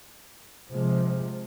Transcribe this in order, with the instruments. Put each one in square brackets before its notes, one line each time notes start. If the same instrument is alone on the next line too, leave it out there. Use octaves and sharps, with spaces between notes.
[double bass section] C3 F3 G#3